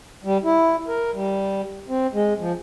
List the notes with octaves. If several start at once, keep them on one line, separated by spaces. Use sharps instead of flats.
G3
E4
A#4
G3
C4
G#3
F3